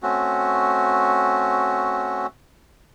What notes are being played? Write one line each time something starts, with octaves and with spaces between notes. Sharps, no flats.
A3 C4 C#4 F#4